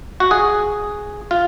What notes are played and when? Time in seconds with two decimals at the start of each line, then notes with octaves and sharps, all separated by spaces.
0.20 F#4
0.31 G#4
1.31 F4